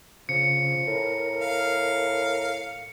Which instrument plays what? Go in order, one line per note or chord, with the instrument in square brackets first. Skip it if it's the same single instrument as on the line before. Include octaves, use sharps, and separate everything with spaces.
[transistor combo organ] C#3 [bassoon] F3 [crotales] C#7
[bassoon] A2 [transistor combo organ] A#4
[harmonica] F5